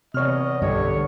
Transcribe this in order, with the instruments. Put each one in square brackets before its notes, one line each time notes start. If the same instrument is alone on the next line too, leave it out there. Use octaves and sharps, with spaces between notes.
[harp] E2 F6 [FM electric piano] C3 C#5 [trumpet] D#5
[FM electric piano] B1 [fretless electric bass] G2 D3 G3 [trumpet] C#5